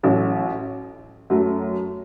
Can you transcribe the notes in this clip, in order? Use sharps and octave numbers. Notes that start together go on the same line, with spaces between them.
A1 A2 F#3
F#2 F#3 A3